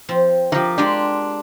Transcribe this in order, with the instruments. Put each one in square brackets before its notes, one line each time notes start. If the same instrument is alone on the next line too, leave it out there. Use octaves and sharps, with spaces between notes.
[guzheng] F3 C4
[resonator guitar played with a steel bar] E3 F3 [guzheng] G4 A#4
[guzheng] G#3 F4 G4 [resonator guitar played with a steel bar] D4